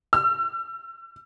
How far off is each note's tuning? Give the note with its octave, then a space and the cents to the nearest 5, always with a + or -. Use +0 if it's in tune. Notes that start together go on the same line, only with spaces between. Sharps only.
E6 +45